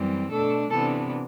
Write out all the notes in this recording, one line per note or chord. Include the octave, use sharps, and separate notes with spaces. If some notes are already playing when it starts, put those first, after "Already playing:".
Already playing: F#2 E3 G3 C4
B2 A3 D4 A4
C3 E3 B3 D4 A4